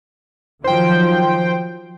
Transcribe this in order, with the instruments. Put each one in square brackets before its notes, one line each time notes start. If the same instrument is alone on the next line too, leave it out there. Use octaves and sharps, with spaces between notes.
[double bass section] D#3 F3 F#3 [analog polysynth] C5 G5